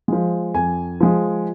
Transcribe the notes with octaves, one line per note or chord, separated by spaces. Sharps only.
F3 G#3
F2 G#5
F3 G#3